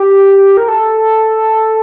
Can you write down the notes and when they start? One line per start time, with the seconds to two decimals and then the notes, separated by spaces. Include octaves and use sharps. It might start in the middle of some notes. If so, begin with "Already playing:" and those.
Already playing: G4
0.57 A#4
0.68 A4